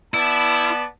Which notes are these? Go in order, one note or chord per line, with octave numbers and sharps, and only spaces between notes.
B3 E4 D5 A5